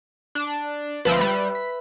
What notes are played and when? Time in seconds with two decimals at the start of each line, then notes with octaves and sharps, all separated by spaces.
0.35 D4
1.05 D2 F3 C4 B4 E5
1.21 G3
1.55 B6